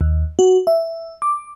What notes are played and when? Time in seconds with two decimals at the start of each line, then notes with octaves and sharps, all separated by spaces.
0.01 D#2
0.39 F#4
0.67 E5
1.22 D6